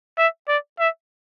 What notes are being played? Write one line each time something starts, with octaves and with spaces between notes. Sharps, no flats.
E5
D5
E5